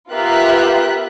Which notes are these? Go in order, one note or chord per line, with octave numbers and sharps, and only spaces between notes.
B3 F4 G4 A#4 E5 F#6